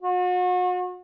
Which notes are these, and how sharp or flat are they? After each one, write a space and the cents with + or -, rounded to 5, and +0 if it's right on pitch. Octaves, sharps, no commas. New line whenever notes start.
F#4 -40